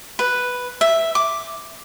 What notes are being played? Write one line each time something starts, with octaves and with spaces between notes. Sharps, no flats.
B4
E5
D6